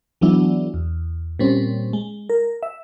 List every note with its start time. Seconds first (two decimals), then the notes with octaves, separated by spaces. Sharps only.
0.21 E3 F#3 G#3 B3 D4 E4
0.74 E2
1.39 A#2 G3 C4 C#4
1.93 G#3
2.29 A#4
2.63 E5